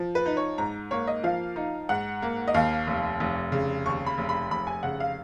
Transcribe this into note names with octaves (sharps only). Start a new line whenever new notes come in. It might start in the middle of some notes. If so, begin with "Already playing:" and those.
Already playing: F3
B4
D#4
C#5
G#2 A#5
A#3 C#5
D#5
F3 F5
D#4
G#2 F#5
A#3
D#5
D#2 F5
F1
F1
C#3
D#2 C#6
B5
F1
B5
F1 B5
G#5
C#3 F#5
F5